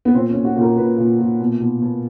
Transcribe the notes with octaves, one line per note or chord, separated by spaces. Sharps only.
B3
A#2 C4
C#4
A#2
F#4
A#2 A#4
A#2 B4
A#2
A#2
B2
B2
B2